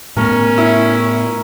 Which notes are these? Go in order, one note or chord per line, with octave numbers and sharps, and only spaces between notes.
A2 A3 B3 C#4 A#4
E4